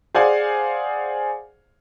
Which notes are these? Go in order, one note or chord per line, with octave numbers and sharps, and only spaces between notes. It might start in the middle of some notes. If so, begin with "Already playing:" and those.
G#4 C5 D5 F5 F#5 G#5